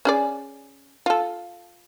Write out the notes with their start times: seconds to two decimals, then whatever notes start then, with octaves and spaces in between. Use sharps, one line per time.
0.05 C#4 G#4 D5
1.06 F4 A4